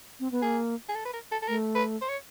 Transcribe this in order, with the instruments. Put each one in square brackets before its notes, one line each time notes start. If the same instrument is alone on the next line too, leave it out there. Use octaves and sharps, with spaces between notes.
[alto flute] C4
B3
[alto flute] A#3 [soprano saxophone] G#4
[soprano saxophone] G#4
A4
B4
A#4
A4
A4
[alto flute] A3 [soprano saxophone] A#4
[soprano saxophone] B4
C5
C#5